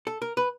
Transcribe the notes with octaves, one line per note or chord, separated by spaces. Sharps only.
A4
A#4
B4